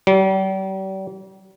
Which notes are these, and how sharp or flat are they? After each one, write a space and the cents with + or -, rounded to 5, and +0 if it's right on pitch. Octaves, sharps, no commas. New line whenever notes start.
G3 -40